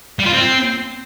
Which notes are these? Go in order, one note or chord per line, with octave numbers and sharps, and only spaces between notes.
G3
F4
C4